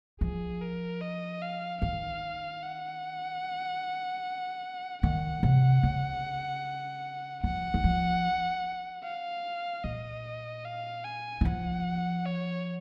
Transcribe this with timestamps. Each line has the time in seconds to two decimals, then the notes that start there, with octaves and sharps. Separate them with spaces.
0.21 F3 G#4
0.61 A#4
1.01 D#5
1.42 F5
1.82 D#3 F5
2.62 F#5
5.03 D#3 F#5
5.43 C3
5.83 C#3
7.44 F3 F#5
7.74 D#3
7.84 F3
9.04 F5
9.84 A#2 D#5
10.65 F5
11.05 G#5
11.41 D#3
11.45 F3 F#5
12.26 C#5